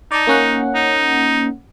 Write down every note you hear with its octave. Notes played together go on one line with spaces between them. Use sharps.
D#4 D5 A5
A#3 C#4 F#5
D#4